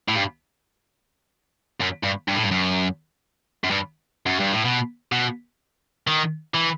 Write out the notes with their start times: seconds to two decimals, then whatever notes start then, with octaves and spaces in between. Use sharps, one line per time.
0.08 A2
0.15 G2
1.81 F#2
2.04 G2
2.28 G2
2.35 A2
2.43 G2
2.51 F#2
3.64 F#2
3.70 G2
4.26 F#2
4.39 G2
4.53 A2
4.65 B2
5.12 B2
6.07 D#3
6.54 E3